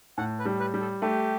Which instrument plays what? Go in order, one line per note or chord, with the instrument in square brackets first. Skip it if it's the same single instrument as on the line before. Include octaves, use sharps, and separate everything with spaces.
[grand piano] A2 [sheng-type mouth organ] F#5
[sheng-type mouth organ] B4
[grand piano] G3
[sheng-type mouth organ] B4
[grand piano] G3
[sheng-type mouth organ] A4
[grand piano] A3 [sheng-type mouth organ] G4